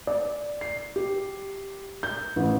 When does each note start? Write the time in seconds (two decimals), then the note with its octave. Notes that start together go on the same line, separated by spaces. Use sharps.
0.07 D5
0.61 C7
0.96 G4
2.03 G6
2.36 A1